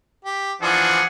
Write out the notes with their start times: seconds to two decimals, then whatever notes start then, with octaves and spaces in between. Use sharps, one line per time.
0.25 G4
0.62 E3 F3 D4 F#4 G#4 F#5